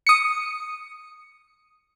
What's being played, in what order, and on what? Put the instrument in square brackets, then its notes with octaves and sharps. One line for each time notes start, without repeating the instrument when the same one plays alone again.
[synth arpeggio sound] D#6 C#7